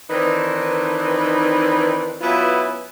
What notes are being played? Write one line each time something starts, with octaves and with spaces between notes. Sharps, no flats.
D#3 E3 C4 D4 D#4 B4
F#3 B3 C#4 E4 F4 B4